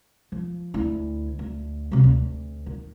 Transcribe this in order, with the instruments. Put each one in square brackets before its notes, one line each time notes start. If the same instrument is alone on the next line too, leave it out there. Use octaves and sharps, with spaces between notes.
[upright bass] F3
D2 E4
D2
C3 F#3
D2
D#3